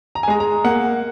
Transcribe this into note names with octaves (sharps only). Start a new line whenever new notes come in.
A#5
G#5
G#3 A#5
A#5
A#3 F#5